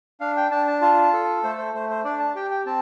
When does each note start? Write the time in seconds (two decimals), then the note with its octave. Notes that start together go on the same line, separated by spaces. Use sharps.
0.21 D4 F5
0.37 G5
0.51 D4 A5
0.67 A5
0.82 F4 A5
1.13 A4
1.44 A3 C5
1.58 C5
1.74 A3 C5
1.90 C5
2.04 D4 D5
2.19 A5
2.35 G4 G5
2.51 G5
2.66 C4 A5